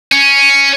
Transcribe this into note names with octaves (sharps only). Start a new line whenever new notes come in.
C#4